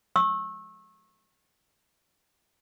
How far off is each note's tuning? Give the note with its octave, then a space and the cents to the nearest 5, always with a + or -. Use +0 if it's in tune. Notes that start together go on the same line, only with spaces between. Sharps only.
C#6 -25 E6 -10